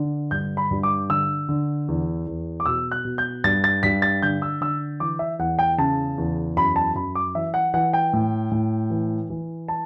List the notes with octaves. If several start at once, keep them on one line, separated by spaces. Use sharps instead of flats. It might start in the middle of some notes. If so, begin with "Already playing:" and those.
Already playing: D3
G2 G6
B5
G2
D6
D3 E6
D3
E2
E2
D6
B2 E6
F#6
B2
G6
G2 A6
A6
G2 B6
A6
D3 G6
E6
D3 E6
E3 D6
E5
E2 F#5
G5
C#3 A5
E2
F#2 B5
A5
F#2 B5
D6
E3 E5
F#5
E3 F#5
G5
A2
A2
E3
E3
A5